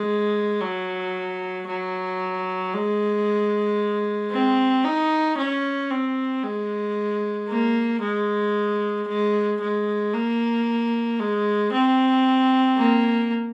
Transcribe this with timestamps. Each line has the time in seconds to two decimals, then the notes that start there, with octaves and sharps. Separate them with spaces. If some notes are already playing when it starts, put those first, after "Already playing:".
Already playing: G#3
0.62 F#3
1.67 F#3
2.73 G#3
4.31 C4
4.84 D#4
5.38 C#4
5.91 C4
6.43 G#3
7.49 A#3
8.02 G#3
9.08 G#3
9.61 G#3
10.13 A#3
11.19 G#3
11.72 C4
12.77 A#3